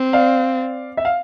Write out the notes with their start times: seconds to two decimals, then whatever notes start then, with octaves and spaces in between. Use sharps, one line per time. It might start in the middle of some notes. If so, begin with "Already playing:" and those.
Already playing: C4
0.13 D5 F5
0.97 E5
1.05 F5